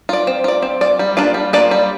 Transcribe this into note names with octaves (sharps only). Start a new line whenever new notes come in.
F4 D5
C4
F4 D5
C4
F4 D5
G3
A#3 D4 F4 D5
G3
A#3 D4 F4 D5
G3